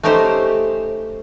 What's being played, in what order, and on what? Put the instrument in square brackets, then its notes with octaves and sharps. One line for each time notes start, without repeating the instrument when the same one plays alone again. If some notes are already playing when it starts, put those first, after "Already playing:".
[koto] A3 C#4 D#4 G4 C5